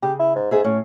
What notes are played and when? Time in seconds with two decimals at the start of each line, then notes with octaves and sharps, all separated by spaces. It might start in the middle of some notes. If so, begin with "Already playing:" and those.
0.03 C#3 G4
0.20 E4
0.36 G#2
0.51 G#2 G#4 E5
0.64 A2 C#4